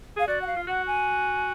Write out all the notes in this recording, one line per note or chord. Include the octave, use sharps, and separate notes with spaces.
G#4 F5
F#4 D5
F#5
F5
F4
F#4 F#5
G#5